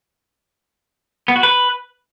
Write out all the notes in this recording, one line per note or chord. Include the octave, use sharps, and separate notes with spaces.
B3
F#4
B4